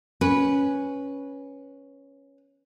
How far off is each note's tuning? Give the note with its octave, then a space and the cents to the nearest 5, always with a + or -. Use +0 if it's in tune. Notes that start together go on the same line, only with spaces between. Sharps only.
C#4 +0 B4 -10